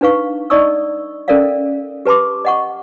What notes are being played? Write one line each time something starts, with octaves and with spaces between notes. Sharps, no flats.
D4 D#4 B4 F5 C#6
D#4 D5 D#5 C#6 D#6 E6
C#4 A4 A#4 D5 E5 F5
G4 B4 A5 C6 D6
D#5 F#5 C#6